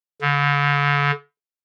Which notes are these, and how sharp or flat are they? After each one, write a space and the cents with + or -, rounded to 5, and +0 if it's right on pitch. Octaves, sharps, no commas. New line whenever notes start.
D3 -40